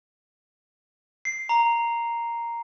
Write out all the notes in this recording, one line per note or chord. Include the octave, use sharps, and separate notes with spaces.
C7
A#5